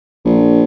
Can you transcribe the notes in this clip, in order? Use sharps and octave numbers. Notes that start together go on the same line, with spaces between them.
A#1